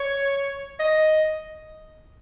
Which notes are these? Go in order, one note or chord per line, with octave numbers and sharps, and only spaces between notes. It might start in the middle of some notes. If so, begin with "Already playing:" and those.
Already playing: C#5
D#5